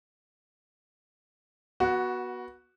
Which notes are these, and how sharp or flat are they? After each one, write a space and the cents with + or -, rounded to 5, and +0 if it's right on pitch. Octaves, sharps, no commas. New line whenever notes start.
B3 -25 F#4 +0